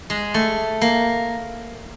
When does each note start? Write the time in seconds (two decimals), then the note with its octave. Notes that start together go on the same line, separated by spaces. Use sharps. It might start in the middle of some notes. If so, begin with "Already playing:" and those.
0.10 G#3
0.34 A3
0.81 A#3